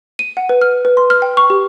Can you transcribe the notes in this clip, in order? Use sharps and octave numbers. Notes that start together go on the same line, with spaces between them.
D#7
F#5
B4
F6
B4
C6
F6
G5
C#6
G4